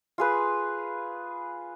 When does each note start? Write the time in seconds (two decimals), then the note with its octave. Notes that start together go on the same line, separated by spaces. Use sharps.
0.18 F4 G#4 B4